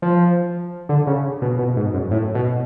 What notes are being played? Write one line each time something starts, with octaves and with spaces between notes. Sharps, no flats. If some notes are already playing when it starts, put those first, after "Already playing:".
F3
D3
C#3
B2
B2
G#2
F#2
A2
B2